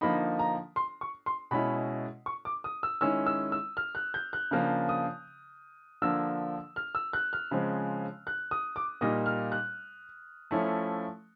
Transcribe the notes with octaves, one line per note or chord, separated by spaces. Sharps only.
D3 F3 A#3 D#4 B5
A#5
C6
C#6
C6
B2 G#3 C#4 E4 B5
C#6
D6
D#6
E6
D#3 G#3 C#4 E4 E6
E6
E6
F6
F#6
G6
F#6
C#3 F3 A#3 D4 F6
D#6
D3 F3 A#3 D4 E6
F6
E6
F#6
F6
C#3 F3 G#3 C4
F#6
D#6
D6
A#2 G3 A#3 D#4 D#6
F6
F#6
F3 A3 C#4 E4